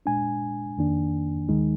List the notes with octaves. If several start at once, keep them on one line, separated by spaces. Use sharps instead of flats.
A#2 G#3 D4 G#5
F2 D#3 A#3 D4
D#2 D#3 G#3 D#4